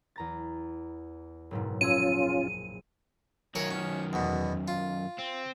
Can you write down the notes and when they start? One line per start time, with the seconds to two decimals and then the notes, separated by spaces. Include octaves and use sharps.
0.16 E2 A#5 A6
1.51 F#1 G#2 B2
1.81 A#1 C#4 F4 G#4 E6 D#7
3.55 F#2 D#3 A#4 C#5 G#5
3.71 C#4
4.13 E2 B2
4.68 F4
5.19 C4